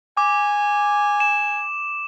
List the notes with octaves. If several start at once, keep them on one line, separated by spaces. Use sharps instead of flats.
G#5 D6
E7